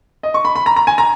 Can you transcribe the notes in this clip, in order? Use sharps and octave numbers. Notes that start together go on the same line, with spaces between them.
D#5
C#6
B5
B5
A#5
A#5
G#5
A#5